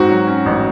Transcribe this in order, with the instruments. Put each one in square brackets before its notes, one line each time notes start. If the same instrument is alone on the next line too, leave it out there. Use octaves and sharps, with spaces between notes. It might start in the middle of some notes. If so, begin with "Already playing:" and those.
Already playing: [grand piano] G#2 C4 [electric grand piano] F#4
[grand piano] F#3
C#4
A1